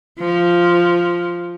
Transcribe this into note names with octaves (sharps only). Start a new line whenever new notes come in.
F3